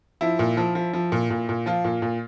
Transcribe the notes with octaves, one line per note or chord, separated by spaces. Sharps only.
F3 E4
A#2
F3
F3
F3
A#2
A#2
A#2
F3 F4
A#2
A#2